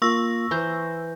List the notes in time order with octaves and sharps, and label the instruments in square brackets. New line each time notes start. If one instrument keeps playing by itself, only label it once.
[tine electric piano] A#3 F4 [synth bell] C#6 E6 A#6
[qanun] E3 C5 A#5 [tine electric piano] B4 G6